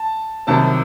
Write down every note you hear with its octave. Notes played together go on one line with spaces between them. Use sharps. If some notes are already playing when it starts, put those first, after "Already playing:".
Already playing: A5
C2 C3 D#3 F#3 C4 A5